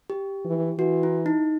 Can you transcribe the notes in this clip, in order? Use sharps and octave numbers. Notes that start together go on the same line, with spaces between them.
G4
E3
E3 F#4
E4
D#4